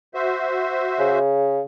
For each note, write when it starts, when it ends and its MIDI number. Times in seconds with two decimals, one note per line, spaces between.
0.14 1.19 66
0.14 1.19 72
0.14 1.19 76
0.99 1.61 49